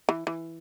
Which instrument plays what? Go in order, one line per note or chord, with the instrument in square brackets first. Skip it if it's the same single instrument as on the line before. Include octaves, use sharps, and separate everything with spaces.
[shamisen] E3
E3